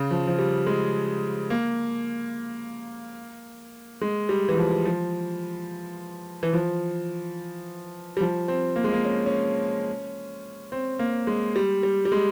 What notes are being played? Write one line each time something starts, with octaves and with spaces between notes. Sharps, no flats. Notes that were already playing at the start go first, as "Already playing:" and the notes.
Already playing: C#3
F3
F3
G3
G#3
A#3
G#3
G3
E3
F3
F3
E3
F3
G3
F3
C4
A#3
G#3
A#3
C#4
C#4
C4
A#3
G#3
G3
G3
G3
G#3